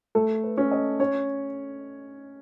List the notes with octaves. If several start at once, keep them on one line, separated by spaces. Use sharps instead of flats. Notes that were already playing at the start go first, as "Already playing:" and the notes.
A3 A4
B4
C#4
D#5
C#4 C#5